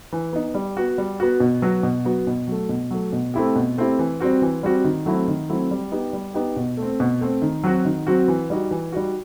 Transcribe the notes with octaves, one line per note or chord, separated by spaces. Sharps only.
E3
B3 D#4
G3
B3 F#4
G3
B3 F#4
B2
F#3 B3 F#4
B2
F#3 B3 F#4
B2
F#3 A3
B2
F#3 A3
B2
A3 C4 E4 G4
B2
A3 C4 E4 G4
E3
G3 C4 F#4
E3
G3 C4 F#4
D#3
F#3 A3 C4 E4
D#3
F#3 A3 C4 E4
G3
B3 D#4 G4
G3
B3 D#4 G4
B2
A3
C4
B2
A3 C4
D#3
F#3 C4 F#4
D#3
F#3 C4 F#4
E3
G3 D#4 F#4
E3
G3 D#4 F#4